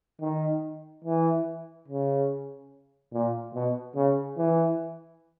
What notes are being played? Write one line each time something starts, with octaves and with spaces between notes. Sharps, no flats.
D#3
E3
C#3
A#2
B2
C#3
E3